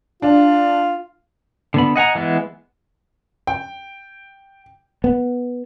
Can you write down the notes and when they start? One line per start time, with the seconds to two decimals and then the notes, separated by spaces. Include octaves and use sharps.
0.22 D4 F4
1.74 D3 B3 B5
1.96 D#5 F#5 G#5 A#5
2.15 E3 G#3 B3
3.47 G5
5.04 B3